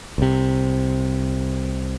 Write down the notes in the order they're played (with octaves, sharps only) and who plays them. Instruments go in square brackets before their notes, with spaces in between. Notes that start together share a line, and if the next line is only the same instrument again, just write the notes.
[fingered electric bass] C2 C3